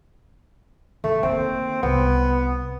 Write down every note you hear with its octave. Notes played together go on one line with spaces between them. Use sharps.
D#3 A3
D#3 A#3 C4
C2 B3